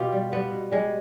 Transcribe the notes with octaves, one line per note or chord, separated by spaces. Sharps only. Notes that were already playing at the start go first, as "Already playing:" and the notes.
Already playing: B2 F4 G4
G3
G3 B3
B2
G3 G#3